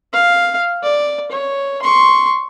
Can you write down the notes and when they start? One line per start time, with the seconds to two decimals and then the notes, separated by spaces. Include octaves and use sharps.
0.13 F5
0.83 D5
1.31 C#5
1.82 C6 C#6